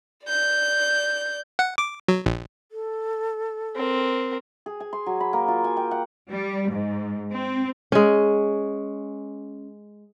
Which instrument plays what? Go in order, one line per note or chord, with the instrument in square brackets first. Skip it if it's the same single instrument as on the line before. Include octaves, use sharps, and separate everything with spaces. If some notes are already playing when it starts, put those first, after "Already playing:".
[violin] D5 G6
[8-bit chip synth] F#5
D6
F#3
A#1
[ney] A4
[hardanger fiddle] C4 A#4
[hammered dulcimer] G#4
G#5
C6
F#3
B5
A#3
F4
G#5
G5
F#5
[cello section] G3
G#2
C4
[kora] G#3 C#4